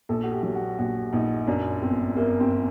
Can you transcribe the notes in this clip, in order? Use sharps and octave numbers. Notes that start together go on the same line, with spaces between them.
A#1 A4
F#4
G4
F#3
F#4
A#1 F#4
A#1 D#4
F#2 D4
G1 C4
G1 A#3
C4